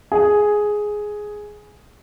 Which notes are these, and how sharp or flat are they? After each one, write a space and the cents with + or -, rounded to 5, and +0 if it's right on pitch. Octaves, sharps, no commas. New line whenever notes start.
G#4 +5